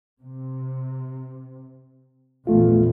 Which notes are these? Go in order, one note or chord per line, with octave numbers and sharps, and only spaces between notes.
C3
A#1 E2 A#2 A3 F4